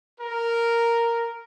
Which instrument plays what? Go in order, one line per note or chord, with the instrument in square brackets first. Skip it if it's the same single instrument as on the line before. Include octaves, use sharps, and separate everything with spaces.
[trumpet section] A#4